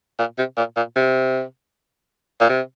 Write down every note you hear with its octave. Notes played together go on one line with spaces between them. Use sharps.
A#2
C3
A#2
A#2
C3
A#2
C3